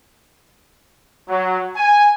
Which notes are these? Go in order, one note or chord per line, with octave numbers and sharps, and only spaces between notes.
F#3
G#5